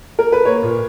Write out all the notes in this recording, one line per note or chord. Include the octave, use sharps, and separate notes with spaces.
A#4
B4
A#3 C#5
A#2